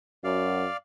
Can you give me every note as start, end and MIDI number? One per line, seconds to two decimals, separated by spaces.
0.24 0.67 42
0.24 0.65 66
0.24 0.77 74
0.24 0.77 77